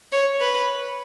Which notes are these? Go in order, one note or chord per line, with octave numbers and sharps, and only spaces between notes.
C#5
B4